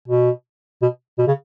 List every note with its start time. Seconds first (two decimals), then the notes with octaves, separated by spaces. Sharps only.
0.08 B2
0.82 B2
1.19 B2
1.27 C#3